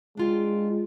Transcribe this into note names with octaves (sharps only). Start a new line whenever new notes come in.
G#3 D4 F4 G5